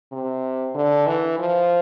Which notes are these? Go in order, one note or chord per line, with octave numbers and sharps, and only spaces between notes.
C3
D3
E3
F3